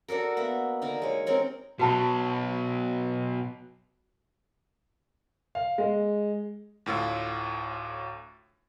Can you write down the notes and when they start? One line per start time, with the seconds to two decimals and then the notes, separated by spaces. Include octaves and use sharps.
0.08 D4 F#4 A4 A#4
0.37 A#3 B3 E5
0.82 D3 D#4 A#4
1.02 G#3 C#5
1.26 C4 C#4 A#4 C#5
1.79 B2 F#3 F#4 A5 B5
5.55 F5
5.78 G#3
6.86 D2 A2 F4 E6